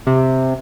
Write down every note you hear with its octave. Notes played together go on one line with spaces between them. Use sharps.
C3